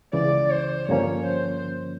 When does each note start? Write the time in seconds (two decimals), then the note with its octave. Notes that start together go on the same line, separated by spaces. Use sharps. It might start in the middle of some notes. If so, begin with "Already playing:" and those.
0.13 C#2 C#3 E3 D5
0.51 C5
0.88 G2 D3 F3 A#3 C#4 C#5
1.26 C5